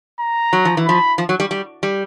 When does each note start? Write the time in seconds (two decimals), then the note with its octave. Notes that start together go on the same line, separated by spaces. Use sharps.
0.20 A#5
0.53 F#3
0.65 F3
0.77 E3
0.86 F3 B5
1.18 F3
1.29 F#3
1.40 G3
1.51 G3
1.83 G3